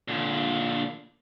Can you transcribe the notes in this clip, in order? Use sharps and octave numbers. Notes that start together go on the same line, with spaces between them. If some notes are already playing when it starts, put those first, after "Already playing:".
A#2 D3